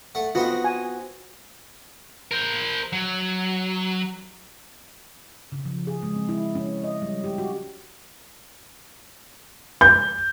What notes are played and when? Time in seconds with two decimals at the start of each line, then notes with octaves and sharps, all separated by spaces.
0.15 A3 F#5
0.35 B3 C4 D#4 F4 F#4
0.64 G#5
2.31 A#4 C5
2.93 F#3
5.52 C#3
5.65 F3
5.87 G#4
6.03 G#3
6.16 C4
6.29 E4
6.55 C#4
6.84 D#5
7.02 G3
7.24 G4
7.38 F#4
9.81 G6